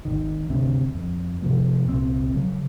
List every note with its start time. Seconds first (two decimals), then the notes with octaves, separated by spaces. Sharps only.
0.05 G#1 D#2 D#3
0.50 G1 D2 C3 D4
0.95 F2
1.42 G#2 C3 F3 A#3
1.86 C2 A#2 F3 C4
2.34 C#3 F#3